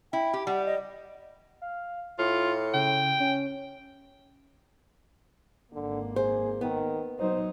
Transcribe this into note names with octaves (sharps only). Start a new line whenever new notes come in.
E4 G5
G4
G3 F#5
D#5
F5
A2 F4 C#7
C#3 G5
C#4
G#1 D3 A#3
G#4 C5
D#3 B3
F#3 D#4 C5